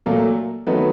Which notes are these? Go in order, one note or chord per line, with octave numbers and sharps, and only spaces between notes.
A#2 F#3 A3 A#3 A4
D#3 F#3 A3 B3 B4